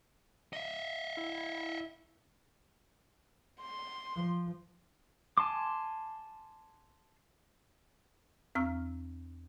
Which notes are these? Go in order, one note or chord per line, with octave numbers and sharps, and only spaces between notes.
D#5 E5
E4
C6
F3
G#5 A5 C6 D6
E2 C4 A#5 C#6 E6 F6